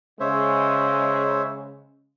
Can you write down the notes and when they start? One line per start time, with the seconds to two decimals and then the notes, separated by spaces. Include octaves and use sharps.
0.20 C#3 G#3 C5 C#5 E5